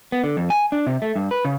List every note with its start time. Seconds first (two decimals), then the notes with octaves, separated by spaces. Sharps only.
0.12 B3
0.24 D3
0.37 F2
0.50 G#5
0.72 D4
0.87 C3
1.02 A3
1.16 G2
1.31 B4
1.45 C#3